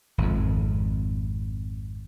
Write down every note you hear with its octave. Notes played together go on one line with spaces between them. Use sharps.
G#1 F2